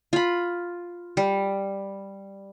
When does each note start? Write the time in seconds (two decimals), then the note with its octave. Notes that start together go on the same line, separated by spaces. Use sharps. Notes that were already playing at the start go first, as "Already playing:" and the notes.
0.13 F4 B5
1.17 G3